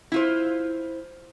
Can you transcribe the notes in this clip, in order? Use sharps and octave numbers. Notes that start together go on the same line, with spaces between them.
E4 F4 C5